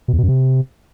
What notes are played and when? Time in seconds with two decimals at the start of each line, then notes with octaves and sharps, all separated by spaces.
0.08 B2
0.13 E2
0.18 B2
0.23 F#2
0.29 C3